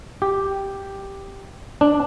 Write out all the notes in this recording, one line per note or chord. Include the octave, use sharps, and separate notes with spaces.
G4
D4